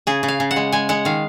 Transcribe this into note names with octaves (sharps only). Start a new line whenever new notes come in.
C#3 G#4
C#3
F5
C#3
F#5
G#3
G#3 G#5
G#3 F#5
D#3 F5